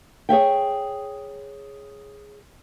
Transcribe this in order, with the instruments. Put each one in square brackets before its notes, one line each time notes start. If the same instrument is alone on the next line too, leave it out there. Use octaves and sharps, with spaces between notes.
[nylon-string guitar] G#4 C#5 E5 G5